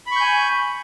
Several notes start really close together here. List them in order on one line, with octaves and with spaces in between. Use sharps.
B5 C#6 G6 G#5